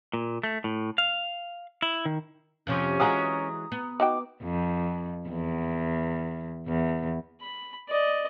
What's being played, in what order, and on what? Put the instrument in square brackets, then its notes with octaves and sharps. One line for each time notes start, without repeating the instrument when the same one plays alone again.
[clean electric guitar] A#2
A3
A2
F5
E4
D#3
[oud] F2 C3 F3 [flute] C#4
[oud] E3 F#3 G#3 [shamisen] F4 F#4 G#4 [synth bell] A#5 D#6
[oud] B3
[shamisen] D#4 F#4 G5 [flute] D6
[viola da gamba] F2
E2
E2
[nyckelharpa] B5
D5 D#5